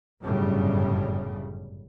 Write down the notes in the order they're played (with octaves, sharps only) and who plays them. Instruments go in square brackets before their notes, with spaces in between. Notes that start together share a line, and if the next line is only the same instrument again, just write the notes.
[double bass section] G1 F#2 A2 C#3 G3